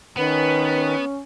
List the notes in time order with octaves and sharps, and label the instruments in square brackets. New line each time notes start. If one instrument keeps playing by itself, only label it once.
[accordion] D#3 [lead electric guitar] B3 [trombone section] C#4 [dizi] B4